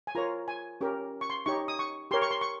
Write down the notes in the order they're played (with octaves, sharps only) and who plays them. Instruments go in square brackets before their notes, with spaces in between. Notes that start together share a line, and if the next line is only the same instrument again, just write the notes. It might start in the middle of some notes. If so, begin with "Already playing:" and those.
[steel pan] G#5
F4 A#4 C#5 A#5
G#5
C#4 G4 A#4
C#6
C6
D#4 G4 C#5 C#6
D#6
C#6
G4 A#4 C#5 C6
C#6
C6
C#6